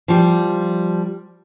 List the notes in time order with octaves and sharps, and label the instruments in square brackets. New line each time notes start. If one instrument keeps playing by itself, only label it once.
[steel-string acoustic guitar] F3 G3